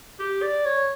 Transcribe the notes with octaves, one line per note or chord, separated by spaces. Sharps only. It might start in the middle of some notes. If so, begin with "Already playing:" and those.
G4
D5
C#5